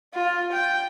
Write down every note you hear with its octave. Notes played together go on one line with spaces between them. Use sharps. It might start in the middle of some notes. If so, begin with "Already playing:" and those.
F4
G5